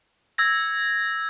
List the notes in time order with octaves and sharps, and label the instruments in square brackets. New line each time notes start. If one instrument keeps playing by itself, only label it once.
[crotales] E6 G#6 A#6